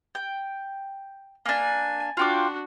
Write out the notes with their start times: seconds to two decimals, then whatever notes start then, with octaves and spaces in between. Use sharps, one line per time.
0.15 G5
1.46 A#3 D4 G#5
2.17 D4 F4 F#4 G5 D6